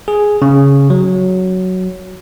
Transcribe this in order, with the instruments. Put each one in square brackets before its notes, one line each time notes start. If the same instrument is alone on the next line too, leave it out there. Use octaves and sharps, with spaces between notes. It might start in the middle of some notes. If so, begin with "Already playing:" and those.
[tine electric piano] G#4
C#3
F#3